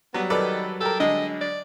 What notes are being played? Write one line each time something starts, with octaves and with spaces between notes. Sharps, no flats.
F#3 G3 B3
D#3 A4 B4 D5
G4 A4 A#4
D3 G#3 D#5
D5